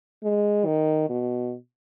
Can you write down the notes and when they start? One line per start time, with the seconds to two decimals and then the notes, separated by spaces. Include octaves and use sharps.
0.23 G#3
0.65 D#3
1.09 B2